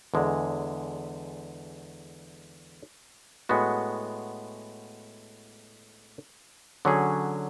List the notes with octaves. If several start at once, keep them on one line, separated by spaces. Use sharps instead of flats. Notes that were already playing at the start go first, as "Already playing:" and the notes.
E2 D3 G#3
A2 G#3 B3 F#4
D3 F#3 C#4 G#4